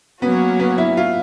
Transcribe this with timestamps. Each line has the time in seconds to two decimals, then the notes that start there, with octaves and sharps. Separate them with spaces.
0.22 F#3 A#3 B3 C#4 F#4
0.60 B3
0.78 E4
0.97 F4